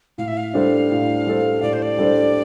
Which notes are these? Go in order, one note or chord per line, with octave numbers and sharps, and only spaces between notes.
A2 F5
E5
F5
G3 D4 A4 C5
A2
G3 D4 A4 C5
A2 D5
C5
D5
G3 D4 A4 C5